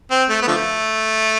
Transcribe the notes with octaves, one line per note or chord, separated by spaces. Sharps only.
C4
A3
B3
D3 F3 A3